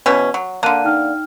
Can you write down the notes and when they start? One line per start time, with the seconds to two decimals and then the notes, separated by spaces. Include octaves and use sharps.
0.06 B2 E3 C#4
0.34 F#3
0.63 D3 A#3 A5 F#6 D#7
0.85 D#4 G5 F6